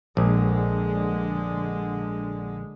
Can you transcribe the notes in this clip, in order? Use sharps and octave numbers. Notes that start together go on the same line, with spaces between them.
A#1 D3 G#3